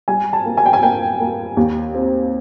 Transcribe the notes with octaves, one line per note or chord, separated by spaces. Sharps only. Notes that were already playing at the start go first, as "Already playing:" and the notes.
G3 G#5
A5
A#3
G#5
G5
G#5
A#3 G5
A#3
D#2
C4